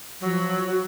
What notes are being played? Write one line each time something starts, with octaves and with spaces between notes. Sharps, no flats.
F3 F#3
F#4